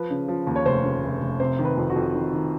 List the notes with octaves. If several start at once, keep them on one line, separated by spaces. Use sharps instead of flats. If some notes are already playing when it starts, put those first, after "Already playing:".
Already playing: F3 B4
C#3
F3
D#2
C#5
F1 C5
C#3
F1
F1
C3 C5
D#3
B4
F2
F#4
F2
D#3
D#3